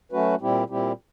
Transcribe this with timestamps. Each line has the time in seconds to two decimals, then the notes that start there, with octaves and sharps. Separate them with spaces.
0.12 F#3 A3 C#4 F#4 B4
0.41 A#2 G3 C4 E4 G4
0.70 A#2 G3 C4 E4 G4